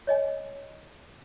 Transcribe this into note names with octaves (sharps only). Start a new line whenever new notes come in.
C#5 D#5 G#5